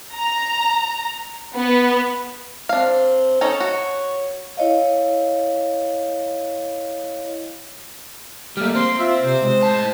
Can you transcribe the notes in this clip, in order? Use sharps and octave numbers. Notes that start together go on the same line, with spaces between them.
A#5
B3
C4 D4 F5
C#4 D#4 A4 C#5
F#4
E4 C#5 D#5 F5
G3 A3 A#3 F6
C4 C6
F4 E5
C3 C5
G#3
A2 A5